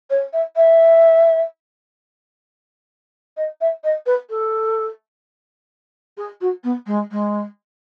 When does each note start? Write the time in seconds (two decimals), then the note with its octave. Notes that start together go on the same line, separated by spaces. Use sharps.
0.10 C#5
0.33 E5
0.56 E5
3.37 D#5
3.61 E5
3.84 D#5
4.06 B4
4.29 A4
6.17 G#4
6.41 F#4
6.63 B3
6.86 G#3
7.11 G#3